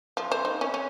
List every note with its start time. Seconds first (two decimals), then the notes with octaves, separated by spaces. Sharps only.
0.17 F3
0.32 C5
0.45 D#4
0.61 C#4
0.74 C#4